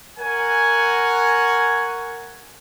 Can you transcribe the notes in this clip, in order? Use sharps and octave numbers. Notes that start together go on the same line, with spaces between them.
A#4 C#5 F#5 G#5